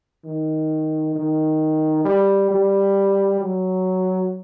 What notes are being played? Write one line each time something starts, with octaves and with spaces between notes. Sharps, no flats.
D#3
D#3
G3
G3
F#3